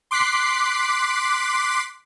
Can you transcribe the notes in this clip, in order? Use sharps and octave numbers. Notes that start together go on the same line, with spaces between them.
C6 D6 F#6 B6 C7